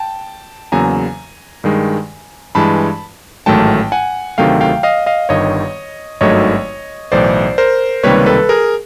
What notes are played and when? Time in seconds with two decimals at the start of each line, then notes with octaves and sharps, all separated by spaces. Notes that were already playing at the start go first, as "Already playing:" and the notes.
Already playing: G5 A5
0.72 E2 C#3 F#3 A#3 G#5 A#5
1.64 G2 D#3 G#3
2.55 G2 E3 G#3 A5 B5
3.46 A1 G#2 D#3 F#3 A3 G5 A5
3.92 F#5 G#5
4.38 D2 C3 D#3 F#3 A3 F5 G5
4.61 F5 G5
4.83 D#5 F5
5.06 D#5 F5
5.29 G1 G2 D#3 C#5 D#5
6.21 G#1 G2 D#3 F#3 A3 C#5 D#5
7.12 B1 A2 E3 C5 D5
7.58 A#4 C5
8.03 C#2 C3 D#3 G3 A#3 B4 C#5
8.26 A4 B4
8.49 G#4 A#4